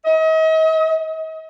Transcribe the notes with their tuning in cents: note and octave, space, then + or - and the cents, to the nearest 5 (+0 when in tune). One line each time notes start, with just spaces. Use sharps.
D#5 +40